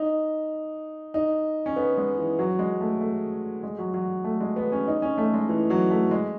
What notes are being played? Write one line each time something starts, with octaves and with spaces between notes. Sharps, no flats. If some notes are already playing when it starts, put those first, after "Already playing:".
Already playing: D#4
D#4
C#4
B3
G#3
E3
F#3
G#3
A3
A3
G#3
F#3
F#3
A3
G#3
B3
C#4
D#4
C#4
A3
G#3
E3
F#3
A3
G#3